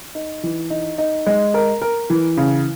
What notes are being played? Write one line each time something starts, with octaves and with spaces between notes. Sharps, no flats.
D#4
E3
D#4
D#4
G#3
A#4
A#4
E3
C#3